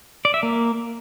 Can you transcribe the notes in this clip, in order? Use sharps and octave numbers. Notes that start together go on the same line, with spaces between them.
D5
E5
A#3